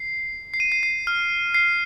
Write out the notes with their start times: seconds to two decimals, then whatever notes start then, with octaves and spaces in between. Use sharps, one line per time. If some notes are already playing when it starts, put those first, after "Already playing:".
Already playing: C7
0.54 C7
0.60 D#7
0.72 C7
0.83 C7
1.07 F6
1.54 C7